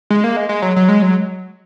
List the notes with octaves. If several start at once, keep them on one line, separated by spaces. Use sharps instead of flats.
G#3
A#3
G#3
G#3
F#3
F#3
G#3
F#3